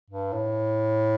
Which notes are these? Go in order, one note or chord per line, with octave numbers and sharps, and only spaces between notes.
G2
A2